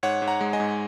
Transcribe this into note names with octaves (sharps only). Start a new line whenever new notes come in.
G#2 C#5 F#5
G#2
F#5 A#5
G#3
D#5 G#5
G#2